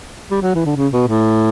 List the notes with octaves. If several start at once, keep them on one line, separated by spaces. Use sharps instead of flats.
G3
F#3
E3
D3
C#3
B2
A2